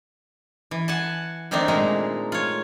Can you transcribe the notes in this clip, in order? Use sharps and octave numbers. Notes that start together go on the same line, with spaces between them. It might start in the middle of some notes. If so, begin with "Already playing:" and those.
E3
F#5 G#5 A5
D#3 A3 C4 D4 D#4
A#2 G#3 A3 A#5
F4 C#5